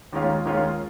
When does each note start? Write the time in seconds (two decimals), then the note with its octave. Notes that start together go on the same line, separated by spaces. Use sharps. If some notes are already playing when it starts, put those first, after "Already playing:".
0.13 D#2 D#3 G#3 C#4 F4
0.45 D#2 D#3 G#3 C#4 F4